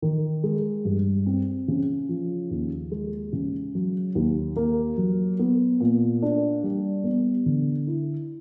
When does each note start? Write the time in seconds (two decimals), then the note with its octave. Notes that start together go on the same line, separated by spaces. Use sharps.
0.02 D#3
0.44 G#3
0.85 G2
1.26 C4
1.68 C#3
2.09 F3
2.51 D#2
2.91 G#3
3.33 C#3
3.75 F#3
4.15 D#2
4.56 A#3
4.98 F#3
5.39 B3
5.80 A#2
6.22 D4
6.64 G3
7.04 B3
7.46 D3
7.87 E4